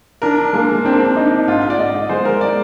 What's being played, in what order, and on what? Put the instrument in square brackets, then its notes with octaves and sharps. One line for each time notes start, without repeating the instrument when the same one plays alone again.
[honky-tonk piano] D4 [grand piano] A#4
[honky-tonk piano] G#3 [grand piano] A#3
[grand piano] A#3
[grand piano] C4 [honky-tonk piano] D4
[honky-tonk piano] D4 [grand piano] D#4
[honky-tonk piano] G#2 [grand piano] F4
[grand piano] D5
[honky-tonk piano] G#2 [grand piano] D#5
[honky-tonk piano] G#3 [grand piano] C5
[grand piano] A#4
[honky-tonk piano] G#3 [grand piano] D5